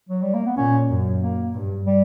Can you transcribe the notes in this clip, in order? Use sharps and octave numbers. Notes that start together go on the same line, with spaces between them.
F#3
G3
A#3
B3
A#2 C#4
F#2
A#3
G2
G3